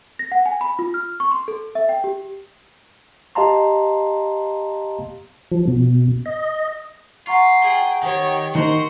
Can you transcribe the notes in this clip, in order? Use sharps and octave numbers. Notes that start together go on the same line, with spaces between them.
A#6
F#5
G#5
B5
F4
F6
C#6
C6
A4
E5
G5
G4
G4 D#5 F5 A5 A#5 C6
F3
B2
D#5
F4 F#5 A#5 C#6
G#4 G5
D#3 G4 C#5
D#3 D#4 F#4 A#4 C5 C6